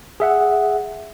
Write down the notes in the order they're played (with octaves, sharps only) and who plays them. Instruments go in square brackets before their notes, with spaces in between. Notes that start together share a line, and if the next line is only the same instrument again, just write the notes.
[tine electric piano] G#4 E5 F#5